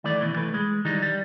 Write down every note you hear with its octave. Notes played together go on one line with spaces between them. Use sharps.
D#3 E3 A3 E4 D5
D#2 B2 E3
E3 A3 B4
G#3
D#3 E3 G3 D#4
G3